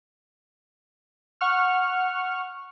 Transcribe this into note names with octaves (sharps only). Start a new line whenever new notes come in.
F#5 C#6 F6